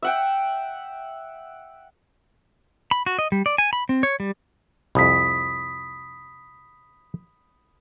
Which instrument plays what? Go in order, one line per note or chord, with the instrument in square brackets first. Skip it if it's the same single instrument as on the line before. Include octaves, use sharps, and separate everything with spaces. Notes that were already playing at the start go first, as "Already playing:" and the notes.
[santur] E5 F#5 G5
[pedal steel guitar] B5
F#4
D#5
G3
D5
G#5
B5
C4
C#5
G3
[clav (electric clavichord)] C2 F2 [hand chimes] B5 D#6 B6